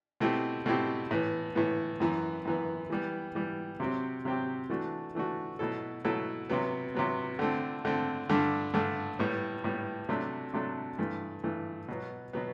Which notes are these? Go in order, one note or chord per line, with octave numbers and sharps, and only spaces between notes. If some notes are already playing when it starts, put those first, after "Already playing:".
B2 A3 C4 E4 G4
B2 A3 C4 E4 G4
A2 E3 B3
A2 E3 B3
F#2 E3 B3
F#2 E3 B3
E3 G3 B3
E3 G3 B3
C3 F#3 C4 G4
C3 F#3 C4 G4
E3 A3 D4 F#4
E3 A3 D4 F#4
B2 F#3 A3 E4 A4
B2 F#3 A3 E4 A4
C3 F#3 B3
C3 F#3 B3
D3 A3 C4
D3 A3 C4
G2 D3 A3 D4
G2 D3 A3 D4
A2 G3 B3
A2 G3 B3
C3 F#3 A3 D4 A4
C3 F#3 A3 D4 A4
G2 E3 A3
G2 E3 A3
B2 F#3 B3
B2 F#3 B3